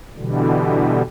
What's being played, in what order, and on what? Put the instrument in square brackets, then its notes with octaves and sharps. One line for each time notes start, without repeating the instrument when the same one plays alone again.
[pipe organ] B2 D3 E3 G3